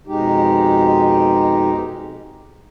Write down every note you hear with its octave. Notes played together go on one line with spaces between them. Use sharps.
F2 B2 G#3 D#4 G4